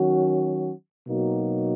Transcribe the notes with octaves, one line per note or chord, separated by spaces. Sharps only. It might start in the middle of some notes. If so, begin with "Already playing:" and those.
Already playing: D#3 F#3 C#4 F#4
B2 F#3 A#3 D#4 F#4